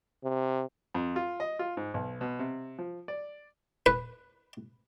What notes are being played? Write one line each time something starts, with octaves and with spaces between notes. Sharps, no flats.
C3
F2
F4
D#5
F4
G#2
B1
B2
C3
F3
D5
B4